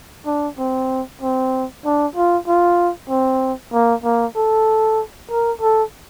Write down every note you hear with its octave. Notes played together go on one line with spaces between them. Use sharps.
D4
C4
C4
D4
F4
F4
C4
A#3
A#3
A4
A#4
A4